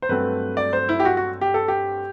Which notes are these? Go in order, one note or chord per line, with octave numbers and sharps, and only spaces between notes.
C5
G2 F#3 A3 C4 B4
D5
C5
E4
G4
F#4
F#4
G4
A4
G4